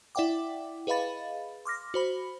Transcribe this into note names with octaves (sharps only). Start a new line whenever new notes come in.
E4 D5 E5 F#5 G5 D6
G#4 B4 D#5 F5 B5 A6
C6 D6 F6 A#6
F#4 C5 B5